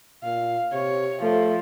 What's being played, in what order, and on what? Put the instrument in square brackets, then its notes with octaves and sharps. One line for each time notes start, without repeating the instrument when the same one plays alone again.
[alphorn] A#2 [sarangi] F5
[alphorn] C3 [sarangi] C#5
[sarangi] F3 [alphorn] A3